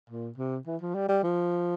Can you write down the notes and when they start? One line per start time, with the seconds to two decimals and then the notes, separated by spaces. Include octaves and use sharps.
0.10 A#2
0.38 C3
0.67 E3
0.81 F3
0.95 G3
1.09 G3
1.23 F3